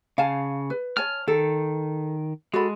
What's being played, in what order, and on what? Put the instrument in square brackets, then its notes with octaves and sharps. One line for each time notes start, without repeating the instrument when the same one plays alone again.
[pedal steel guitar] C#3 [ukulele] F5 G#5 A5
[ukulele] B4
[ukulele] C#5 G#5 A5 [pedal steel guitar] F6
[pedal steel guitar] D#3 [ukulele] A4
[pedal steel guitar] G#3 [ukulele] F#4 A4 B5